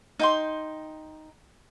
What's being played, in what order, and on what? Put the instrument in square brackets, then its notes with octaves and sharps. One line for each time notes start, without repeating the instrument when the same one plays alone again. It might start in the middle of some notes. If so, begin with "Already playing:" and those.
[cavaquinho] D#4 G5 C6